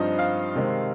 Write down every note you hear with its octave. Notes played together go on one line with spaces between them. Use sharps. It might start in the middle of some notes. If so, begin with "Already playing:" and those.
Already playing: G2 F3 C4 D#4 D#5
F5
C3 D#3 G#3 C4